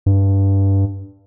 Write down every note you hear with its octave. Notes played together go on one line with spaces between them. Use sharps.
G2